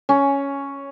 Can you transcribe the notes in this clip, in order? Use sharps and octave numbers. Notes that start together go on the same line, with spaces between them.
C#4